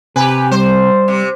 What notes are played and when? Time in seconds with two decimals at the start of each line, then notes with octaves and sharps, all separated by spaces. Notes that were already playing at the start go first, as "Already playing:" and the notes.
0.16 C3 G4 B4 G#5
0.51 G3 C5
1.08 C3